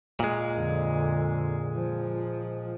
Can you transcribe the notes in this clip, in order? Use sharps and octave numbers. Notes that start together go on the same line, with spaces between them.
A#2 G#3
F2 D3
F3